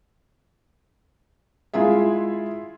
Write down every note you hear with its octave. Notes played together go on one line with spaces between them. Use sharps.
G#3 E4 F4 G#4 E5